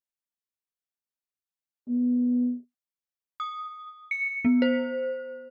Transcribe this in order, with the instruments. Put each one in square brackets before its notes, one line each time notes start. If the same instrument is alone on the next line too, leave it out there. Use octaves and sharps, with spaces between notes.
[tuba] B3
[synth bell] D#6
C#7
B3
C5